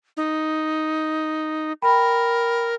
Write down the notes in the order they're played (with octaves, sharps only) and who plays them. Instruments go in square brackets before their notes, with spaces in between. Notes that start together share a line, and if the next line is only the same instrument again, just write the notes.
[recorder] D#4
[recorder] A#4 [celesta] G5 B5